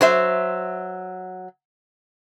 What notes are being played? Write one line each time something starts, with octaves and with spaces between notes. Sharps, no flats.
F#3 C5 E5